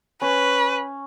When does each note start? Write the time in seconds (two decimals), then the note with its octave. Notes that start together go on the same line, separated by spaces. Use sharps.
0.22 C#4 B4